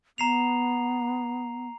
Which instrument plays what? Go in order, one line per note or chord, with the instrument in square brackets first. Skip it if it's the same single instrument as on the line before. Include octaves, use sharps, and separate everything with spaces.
[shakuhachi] B3 [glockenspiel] A#5 C7 F7